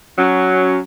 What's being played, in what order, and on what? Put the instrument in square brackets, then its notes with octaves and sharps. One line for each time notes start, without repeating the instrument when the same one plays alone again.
[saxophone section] F#3 C#4